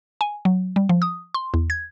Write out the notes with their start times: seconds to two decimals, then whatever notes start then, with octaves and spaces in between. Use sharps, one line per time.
0.21 G#5
0.45 F#3
0.76 G3
0.89 F3
1.02 D#6
1.34 C6
1.54 E2
1.70 G#6